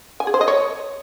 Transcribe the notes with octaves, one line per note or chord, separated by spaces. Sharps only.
G#5
G#4
C5
D#5
C#5